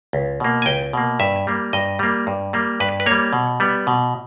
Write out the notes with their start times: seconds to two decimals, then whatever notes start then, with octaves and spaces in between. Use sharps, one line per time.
0.13 C#2
0.40 B2 A#3
0.62 G#5
0.66 C#2 G5
0.93 B2 A#3
1.20 G2 E5
1.47 G3 A#3
1.73 G2 D#5
1.99 G3 A#3
2.27 G2
2.53 G3 A#3
2.80 G2 B4
3.00 B4
3.06 G3 A#3 C#5
3.33 B2
3.60 G3 B3
3.87 B2